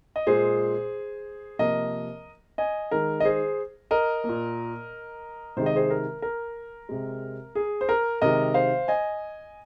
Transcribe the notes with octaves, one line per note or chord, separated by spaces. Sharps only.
D#5
A#2 G#3 G#4 C5
C3 F3 A#3 A#4 D#5
D#5 G#5
D#3 G#3 A#4
D#5
G#4 C5
A#4 D#5
A#3
A#2
C3 D#3 G#3 C5
D#5
G#4 C5
A#4
A#4
C3 G#3
G#4
C5
A#4
C3 D#3 G#3 A#4 D#5
C5 F5
D#5 G#5